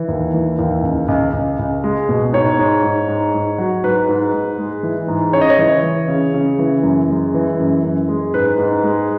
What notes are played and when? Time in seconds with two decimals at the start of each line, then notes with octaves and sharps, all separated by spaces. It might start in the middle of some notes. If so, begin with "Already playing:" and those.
Already playing: E3
0.08 D#2
0.34 E3
0.59 D#2
0.83 C#2
1.08 C#2
1.33 C#2
1.59 C#2
1.84 G#3
2.09 B2
2.33 G#2 C#5
2.59 G#2
2.83 G#2
3.08 G#2
3.34 G#2
3.58 F#3
3.84 G#2 B4
4.09 G#2
4.33 G#2
4.58 G#3
4.83 E3
5.08 G#2
5.33 C#3 C#5
5.41 D#5
5.50 C#5
5.59 E3
5.83 E3
6.08 C#3
6.34 C#3
6.59 E3
6.83 F#2
7.09 G#3
7.34 E3
7.59 F#2
7.83 F#2
8.09 G#3
8.34 G#2 B4
8.58 G#2
8.84 G#3